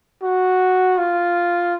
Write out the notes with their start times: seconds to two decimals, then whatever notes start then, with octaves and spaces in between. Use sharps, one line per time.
0.23 F#4
0.98 F4